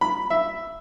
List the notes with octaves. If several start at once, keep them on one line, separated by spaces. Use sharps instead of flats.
B5
E5